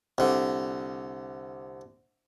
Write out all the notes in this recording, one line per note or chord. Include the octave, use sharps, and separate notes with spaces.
C2 D3